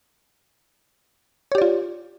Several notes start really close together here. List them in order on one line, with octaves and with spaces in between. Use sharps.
C#5 G4 D5 F4